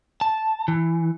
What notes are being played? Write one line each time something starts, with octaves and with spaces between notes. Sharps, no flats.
A5
E3